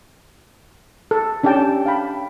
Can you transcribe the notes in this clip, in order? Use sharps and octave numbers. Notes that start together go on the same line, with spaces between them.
A4
C#4 D4 G4 D5 G5 A5
F5 G5 B5